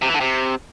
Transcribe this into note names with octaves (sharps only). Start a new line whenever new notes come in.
C3
E3
D3
C3